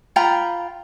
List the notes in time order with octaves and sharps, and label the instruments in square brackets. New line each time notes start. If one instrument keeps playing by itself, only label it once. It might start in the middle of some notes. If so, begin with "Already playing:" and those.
[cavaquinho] F4 G5 A#5 B5